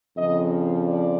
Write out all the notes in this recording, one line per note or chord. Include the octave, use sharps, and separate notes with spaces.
F2 C#3 F3 D#5
D5